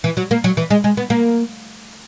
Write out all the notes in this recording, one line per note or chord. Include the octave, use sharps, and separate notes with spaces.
E3
F#3
A#3
F#3
E3
G#3
G#3
B3
A#3